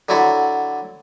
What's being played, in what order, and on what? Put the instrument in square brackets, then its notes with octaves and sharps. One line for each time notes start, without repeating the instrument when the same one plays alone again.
[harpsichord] D3 F#3 E4 F#4 A4